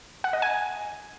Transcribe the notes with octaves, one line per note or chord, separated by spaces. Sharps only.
F#5
D#5
G#5